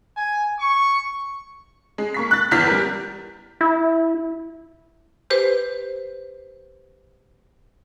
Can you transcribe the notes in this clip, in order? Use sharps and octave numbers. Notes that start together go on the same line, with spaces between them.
G#5
C#6
G#3
A#3 C#6 B6
F#6 A6
G1 E2 E3 F6 G6 B6
G3 A#4
E4
G4 B4 C5